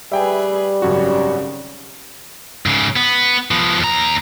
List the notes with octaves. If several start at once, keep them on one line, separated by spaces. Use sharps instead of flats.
G3 G#4 B4 E5 G5 G#5
G#1 F#2 C#3 F#4
G#2 C#3
B3
F3 B3
D#2 A#5